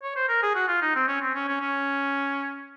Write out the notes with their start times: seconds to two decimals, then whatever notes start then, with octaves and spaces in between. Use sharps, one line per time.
0.03 C#5
0.16 C5
0.29 A#4
0.43 G#4
0.55 F#4
0.68 F4
0.82 D#4
0.96 C4
1.08 C#4
1.22 C4
1.35 C#4
1.48 C#4
1.61 C#4